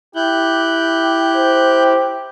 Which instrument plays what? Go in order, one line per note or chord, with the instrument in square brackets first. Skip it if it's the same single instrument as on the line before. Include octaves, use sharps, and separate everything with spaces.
[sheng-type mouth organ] E4 [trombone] G4 [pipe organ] F#6 G6
[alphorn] C5